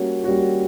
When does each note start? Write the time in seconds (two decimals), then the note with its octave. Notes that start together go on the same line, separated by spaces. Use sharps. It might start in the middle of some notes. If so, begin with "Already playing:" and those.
Already playing: G3 A#3 C#4 F#4
0.24 G3 A#3 C#4 F#4